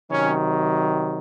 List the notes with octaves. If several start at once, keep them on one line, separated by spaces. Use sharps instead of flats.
C3 D#3 F#3 C#4